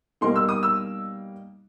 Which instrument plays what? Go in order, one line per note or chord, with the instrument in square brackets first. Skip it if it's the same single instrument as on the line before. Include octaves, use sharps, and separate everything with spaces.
[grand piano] B2 G3 A#3 D#4 C6
E6
D#6
E6